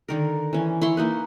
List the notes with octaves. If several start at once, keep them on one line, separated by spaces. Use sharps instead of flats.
D3 D#3 A#4
E3 C#4
E4 C#5 C6
A#3 D#4 B4